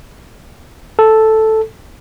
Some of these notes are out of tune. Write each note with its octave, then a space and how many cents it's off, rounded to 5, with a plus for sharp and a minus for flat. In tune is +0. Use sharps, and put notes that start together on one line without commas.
A4 +0